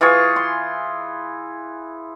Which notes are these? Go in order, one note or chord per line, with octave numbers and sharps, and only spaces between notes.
E3 F4 G#4 C#6
C6